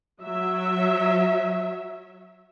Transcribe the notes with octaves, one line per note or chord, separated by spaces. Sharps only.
F#3 E5